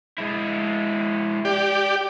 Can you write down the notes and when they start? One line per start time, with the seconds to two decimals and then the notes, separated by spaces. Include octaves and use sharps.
0.18 G#3 E4
1.45 G4 D5